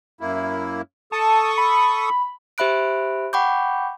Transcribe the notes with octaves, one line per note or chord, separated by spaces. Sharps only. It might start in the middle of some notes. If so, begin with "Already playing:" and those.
F#2 A#3 E4
A4 A5 C#6 D#6
B5
G4 C5 E5 B5 F#6 D7
F#5 G5 B5 C#6 D6 G6